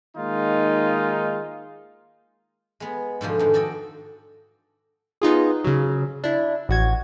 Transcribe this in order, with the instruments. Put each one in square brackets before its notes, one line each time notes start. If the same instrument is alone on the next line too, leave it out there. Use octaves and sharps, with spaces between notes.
[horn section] D#3 G#3 A#3 D#4 F4
[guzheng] G#3 B3
G#2 B2 D3 F3
F2 G#2 D#3
D4 F#4 A4 D#5 G5
[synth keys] B3 D#4 F4 G#4
C#3 F#3
D4 E4
A1 F#4 G#6